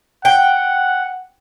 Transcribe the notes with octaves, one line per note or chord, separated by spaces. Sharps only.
F#5 G5